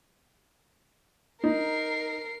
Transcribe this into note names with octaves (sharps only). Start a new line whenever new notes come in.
D#4 A#4 C7